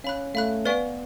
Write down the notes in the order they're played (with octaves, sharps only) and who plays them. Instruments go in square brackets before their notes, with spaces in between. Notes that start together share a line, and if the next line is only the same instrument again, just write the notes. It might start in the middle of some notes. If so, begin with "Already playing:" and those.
[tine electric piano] C#4 [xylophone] F5 B5 F#6
[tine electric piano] A3 [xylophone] F5 B5 F#6
[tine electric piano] B3 [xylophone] B4 D5 F5 G#5 C#6